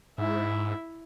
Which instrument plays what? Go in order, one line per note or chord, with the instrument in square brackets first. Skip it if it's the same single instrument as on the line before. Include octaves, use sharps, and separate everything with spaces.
[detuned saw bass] G#2 [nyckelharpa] E4 E5